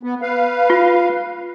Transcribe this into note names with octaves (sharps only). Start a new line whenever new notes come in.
B3
B4 F5
F4